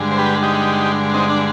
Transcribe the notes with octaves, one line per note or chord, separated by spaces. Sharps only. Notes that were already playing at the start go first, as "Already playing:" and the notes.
Already playing: G2 D3 G#3
C5
G4 B4
D#4 G4
C4 D#4
D4